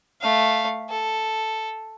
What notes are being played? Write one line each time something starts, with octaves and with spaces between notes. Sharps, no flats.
A3 F5
A4